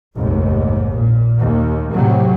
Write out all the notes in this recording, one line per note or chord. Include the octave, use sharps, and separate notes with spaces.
F1 A#1 D#2 G#2
A#2
D#2
F2 A2 C3 F#3